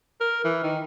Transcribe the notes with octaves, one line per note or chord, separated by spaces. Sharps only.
A#4
E3
D#3